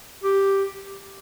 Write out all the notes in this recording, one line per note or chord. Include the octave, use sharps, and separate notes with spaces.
G4